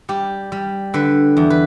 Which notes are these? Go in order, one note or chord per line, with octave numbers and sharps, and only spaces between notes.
G3 G4
G3
D3 B4
E2
B4